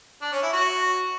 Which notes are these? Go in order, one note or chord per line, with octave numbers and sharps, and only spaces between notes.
D4
C#4
E4
F#4